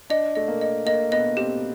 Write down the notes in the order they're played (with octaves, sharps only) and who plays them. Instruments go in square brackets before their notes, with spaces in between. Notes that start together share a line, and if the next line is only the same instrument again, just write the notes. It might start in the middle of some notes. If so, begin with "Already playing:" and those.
[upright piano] D4 [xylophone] D#5
[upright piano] A3 [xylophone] D#5
[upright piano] A#3
[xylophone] D#5
[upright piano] A#3 [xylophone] D#5
[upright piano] B3 [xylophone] D#5
[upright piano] C4 [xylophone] G4